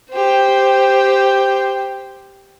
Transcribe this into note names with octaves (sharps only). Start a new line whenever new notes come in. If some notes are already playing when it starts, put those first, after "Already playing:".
G4 C5